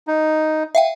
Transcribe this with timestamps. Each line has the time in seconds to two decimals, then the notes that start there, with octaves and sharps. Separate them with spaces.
0.07 D#4
0.75 E5 F5 G5